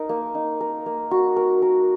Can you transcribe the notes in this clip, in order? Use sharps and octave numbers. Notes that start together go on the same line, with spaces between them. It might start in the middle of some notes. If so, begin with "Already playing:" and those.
Already playing: D#4 A#4
A#3
D#4
A#4
A#3
F#4
A#4
A#4